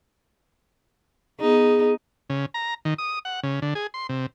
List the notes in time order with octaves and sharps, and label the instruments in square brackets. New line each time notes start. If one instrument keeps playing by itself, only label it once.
[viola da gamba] B3 D#4 [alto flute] G#4
[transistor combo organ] C#3
A#5
D#3
D#6
F#5
C#3
D3
G#4
C6
C3